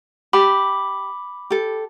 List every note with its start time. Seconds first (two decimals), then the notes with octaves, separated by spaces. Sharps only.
0.33 G4 B5 D6
1.50 G4 A4